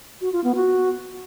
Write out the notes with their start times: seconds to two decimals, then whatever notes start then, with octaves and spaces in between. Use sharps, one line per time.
0.21 F#4
0.33 F4
0.44 B3
0.55 F#4